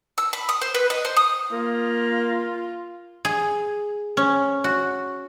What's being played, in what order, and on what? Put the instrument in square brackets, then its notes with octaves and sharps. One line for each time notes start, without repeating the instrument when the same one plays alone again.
[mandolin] E6
B5
D#6
C5
B4
D#5
C5
D#6
[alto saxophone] A#3 [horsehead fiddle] F4
[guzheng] G#4
C#4
F#4